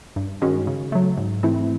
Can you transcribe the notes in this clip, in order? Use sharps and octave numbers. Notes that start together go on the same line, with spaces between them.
G2
D#3 G#3 C#4 F#4
C#3
F#3 A3
G#2
E3 A3 C4 E4